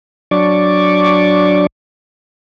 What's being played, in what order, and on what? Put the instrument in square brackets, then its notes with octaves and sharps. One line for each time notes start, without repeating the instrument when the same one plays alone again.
[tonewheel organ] F#3 D4 D5 C#6 D6